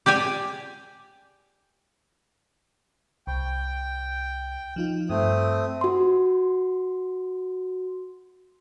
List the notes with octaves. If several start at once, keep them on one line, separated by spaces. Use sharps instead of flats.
G4 D5 G5 G#5
C2 G5
F3 D#4 F4
G2 A3 C4 D#6
F#4 C6